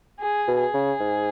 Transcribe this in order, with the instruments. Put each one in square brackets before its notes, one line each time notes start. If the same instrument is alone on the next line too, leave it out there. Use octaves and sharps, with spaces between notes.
[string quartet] G#4
[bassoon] B2
[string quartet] G#4
[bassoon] C#3
G#2